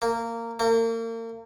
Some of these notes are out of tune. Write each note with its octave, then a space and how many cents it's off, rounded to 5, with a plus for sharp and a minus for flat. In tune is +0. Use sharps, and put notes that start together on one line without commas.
A#3 -15
A#3 -35